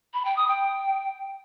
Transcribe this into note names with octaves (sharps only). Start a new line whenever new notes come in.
B5
G5
D#6
G5